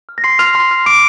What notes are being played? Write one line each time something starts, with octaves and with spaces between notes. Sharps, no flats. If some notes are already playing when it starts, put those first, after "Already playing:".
F6
A#6
C6 C7
C6 F6 F7
C6 F6 C7
F6
C6 D6 D7